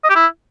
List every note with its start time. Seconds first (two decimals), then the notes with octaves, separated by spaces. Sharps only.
0.04 D#5
0.10 G4
0.16 E4